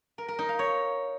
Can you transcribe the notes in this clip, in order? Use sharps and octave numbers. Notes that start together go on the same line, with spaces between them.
A#4
A#4
D#4
F5
C#5